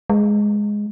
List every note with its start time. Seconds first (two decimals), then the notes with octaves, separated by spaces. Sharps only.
0.10 G#3